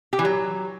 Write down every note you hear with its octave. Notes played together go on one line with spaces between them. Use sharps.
G4
E3
F#3